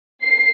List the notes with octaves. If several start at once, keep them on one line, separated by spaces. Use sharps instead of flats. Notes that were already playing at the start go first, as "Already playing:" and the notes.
C7